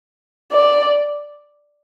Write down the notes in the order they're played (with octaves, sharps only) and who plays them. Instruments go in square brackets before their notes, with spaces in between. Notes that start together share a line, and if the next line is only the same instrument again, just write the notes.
[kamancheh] D5